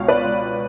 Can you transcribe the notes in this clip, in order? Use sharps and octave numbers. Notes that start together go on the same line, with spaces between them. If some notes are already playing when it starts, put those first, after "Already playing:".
Already playing: C#2 B2 C#5 F5
B4 D5
C#2